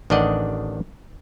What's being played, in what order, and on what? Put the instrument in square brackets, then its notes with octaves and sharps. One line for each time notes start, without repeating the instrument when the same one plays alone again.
[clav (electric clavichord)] A1 D#3 D4 D5 D#5 F#5